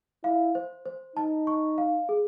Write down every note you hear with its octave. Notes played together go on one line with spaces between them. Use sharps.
E4 F5
C5
C5
D#4 A5
C#6
F5
G#4